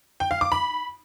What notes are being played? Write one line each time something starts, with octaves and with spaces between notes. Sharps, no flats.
G5
F5
D6
B5